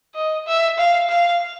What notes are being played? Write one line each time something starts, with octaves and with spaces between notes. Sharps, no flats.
D#5
E5
F5
F5